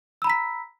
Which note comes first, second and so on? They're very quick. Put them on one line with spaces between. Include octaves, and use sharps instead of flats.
E6 B5 A#5 B6